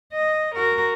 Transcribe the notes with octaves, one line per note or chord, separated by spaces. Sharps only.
D#5
F#4 A#4